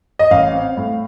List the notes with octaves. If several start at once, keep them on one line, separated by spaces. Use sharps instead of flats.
D#5
A1 F5
C4
A2